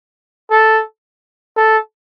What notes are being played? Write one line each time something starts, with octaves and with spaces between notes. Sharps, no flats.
A4
A4